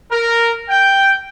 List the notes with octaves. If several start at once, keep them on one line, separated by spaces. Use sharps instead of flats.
A#4
G5